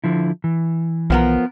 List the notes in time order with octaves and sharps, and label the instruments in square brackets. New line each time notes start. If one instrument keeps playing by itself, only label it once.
[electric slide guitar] D3 F3 E4
E3
[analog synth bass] B1 [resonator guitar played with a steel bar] F3 B3 A#4